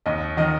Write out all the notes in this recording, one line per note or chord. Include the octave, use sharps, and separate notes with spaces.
D#2 D#5
D#3 D#5